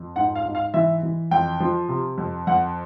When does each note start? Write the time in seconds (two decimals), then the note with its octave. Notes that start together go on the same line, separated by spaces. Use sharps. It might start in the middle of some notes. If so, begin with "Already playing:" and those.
Already playing: F2
0.16 G#2 F#5
0.35 F5
0.45 G#2
0.55 F5
0.74 E3 E5
1.03 E3
1.31 F2 G5
1.60 F3
1.89 C3
2.18 F2
2.47 F2 F#5